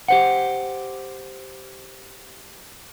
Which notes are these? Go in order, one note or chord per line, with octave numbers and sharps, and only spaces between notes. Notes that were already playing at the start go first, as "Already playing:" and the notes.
G4 C5 F#5